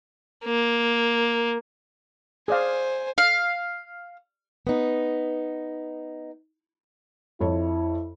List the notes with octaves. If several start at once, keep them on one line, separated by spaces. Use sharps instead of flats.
A#3
G#4 C5 D5 F5 G#5
F5
B3 D#4
F2 E4 C#5